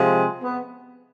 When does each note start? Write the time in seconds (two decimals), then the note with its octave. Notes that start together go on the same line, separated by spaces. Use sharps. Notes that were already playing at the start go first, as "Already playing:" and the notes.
Already playing: C3 F3 G#3
0.42 B3